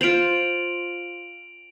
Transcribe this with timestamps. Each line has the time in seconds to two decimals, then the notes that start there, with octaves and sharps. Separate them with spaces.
0.01 F4 C5 D7 F7 F#7